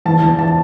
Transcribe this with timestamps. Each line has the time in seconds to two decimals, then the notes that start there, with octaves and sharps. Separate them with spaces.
0.05 E2 A5
0.22 E2
0.39 A5